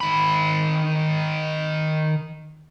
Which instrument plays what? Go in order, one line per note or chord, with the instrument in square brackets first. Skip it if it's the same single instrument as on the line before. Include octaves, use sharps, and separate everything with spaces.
[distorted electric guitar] D#3 B5